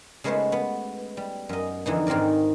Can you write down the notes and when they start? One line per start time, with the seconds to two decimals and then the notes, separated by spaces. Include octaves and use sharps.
0.24 C#3 G#3 A3 B3 F#4 C5
0.52 B3
1.17 G3
1.49 F#2 D#5
1.86 F2 D3 E3 D#4
2.07 G#2 D#3 C4 A#4 D5